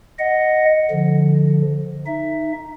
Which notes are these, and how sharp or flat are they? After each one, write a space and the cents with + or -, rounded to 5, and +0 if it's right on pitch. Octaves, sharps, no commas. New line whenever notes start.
D#5 +0 F#5 +0
D3 -5 F3 +0
D#4 +0 E5 +10